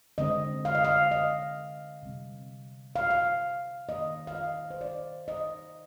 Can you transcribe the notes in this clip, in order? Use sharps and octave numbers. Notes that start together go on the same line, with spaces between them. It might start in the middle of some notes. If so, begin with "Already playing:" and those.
D3 G#3 C4 D#5
F5
D#5
F5
D#5
C3 G3 C4
F5
F5
D#3 A#3 D#5
F5
D#5
C5
D5
D#5